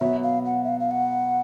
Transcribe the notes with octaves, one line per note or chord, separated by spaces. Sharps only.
B2 F#3 B3 E5
F5
F#5
E5
F5
F5
F#5